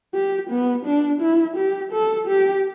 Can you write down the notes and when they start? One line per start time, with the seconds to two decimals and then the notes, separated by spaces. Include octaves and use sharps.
0.14 G4
0.50 B3
0.86 D4
1.21 E4
1.57 G4
1.93 A4
2.28 G4